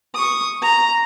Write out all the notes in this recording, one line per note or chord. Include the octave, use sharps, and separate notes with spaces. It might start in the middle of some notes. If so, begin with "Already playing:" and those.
C#6 D#6
A#5